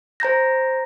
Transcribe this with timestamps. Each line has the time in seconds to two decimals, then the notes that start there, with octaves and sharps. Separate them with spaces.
0.20 C5 A#5 G6 A#6